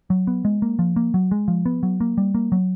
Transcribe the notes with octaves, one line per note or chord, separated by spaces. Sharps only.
F#3
B3
G#3
A#3
F3
A#3
F#3
G#3
F3
B3
F#3
A#3
G3
A#3
F#3